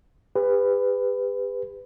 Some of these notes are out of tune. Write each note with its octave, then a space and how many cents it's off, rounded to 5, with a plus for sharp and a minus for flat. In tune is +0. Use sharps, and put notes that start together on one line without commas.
G4 +45 B4 +15